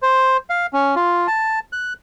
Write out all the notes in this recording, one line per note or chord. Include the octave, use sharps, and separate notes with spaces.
C5
F5
C#4
F4
A5
F#6